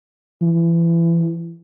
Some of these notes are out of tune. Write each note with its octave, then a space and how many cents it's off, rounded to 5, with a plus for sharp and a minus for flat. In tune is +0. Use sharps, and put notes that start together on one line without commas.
E3 +30